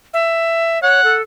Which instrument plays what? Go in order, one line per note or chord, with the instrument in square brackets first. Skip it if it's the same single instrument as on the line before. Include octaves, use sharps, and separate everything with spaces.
[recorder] E5
[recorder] C#5 [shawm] F#5
[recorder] A4